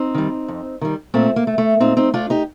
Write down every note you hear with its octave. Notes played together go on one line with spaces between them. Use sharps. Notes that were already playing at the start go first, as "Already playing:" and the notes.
Already playing: C4 D#4
D#3 G3
F2
D#3 G3
A#2 A3 C4
A#3
A3
A3
A#2 C4 D#4
C4 D#4
A3 D4 F4
D#4 G4